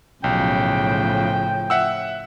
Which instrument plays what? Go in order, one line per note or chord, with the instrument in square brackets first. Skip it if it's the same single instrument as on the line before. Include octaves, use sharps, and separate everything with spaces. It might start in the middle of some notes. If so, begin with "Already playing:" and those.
[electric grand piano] B1 [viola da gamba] A2 C#3 F3 [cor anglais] G5
[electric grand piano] E5 F#5 E6